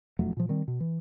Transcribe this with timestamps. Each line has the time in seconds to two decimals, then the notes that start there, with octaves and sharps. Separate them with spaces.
0.19 E1 F2 F#3 A3
0.37 A#2 F3
0.49 D#3 G3 C4
0.68 B2
0.80 E3